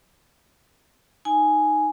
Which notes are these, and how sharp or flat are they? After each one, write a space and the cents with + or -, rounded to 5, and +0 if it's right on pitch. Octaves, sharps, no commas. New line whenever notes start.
D#4 +0 G#5 +0